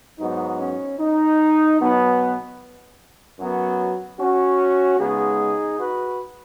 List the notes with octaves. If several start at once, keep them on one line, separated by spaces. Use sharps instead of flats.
G#2 F#3 B3 D#4
C#4
D#4
B2 F#3 B3
F#2 F#3 B3
C#4 F#4
C#3 G#3 B3 D#4 G#4
F#4 B4